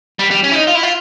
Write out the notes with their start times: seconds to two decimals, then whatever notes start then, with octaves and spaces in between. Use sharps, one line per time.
0.19 G3
0.31 G3
0.44 C#4
0.52 E4
0.55 D#4
0.67 F4
0.75 E4
0.83 F4